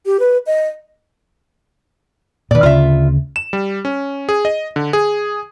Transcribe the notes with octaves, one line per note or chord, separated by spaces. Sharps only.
G4
B4
D#5
A#2 D#3 B4 D5
D2 C#3 F4 E5
E7
G3
C#4
G#4
D#5
D3
G#4